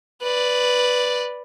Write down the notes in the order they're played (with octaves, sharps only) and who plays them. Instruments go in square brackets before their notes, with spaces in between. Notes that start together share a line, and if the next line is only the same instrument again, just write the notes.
[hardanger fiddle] B4 D5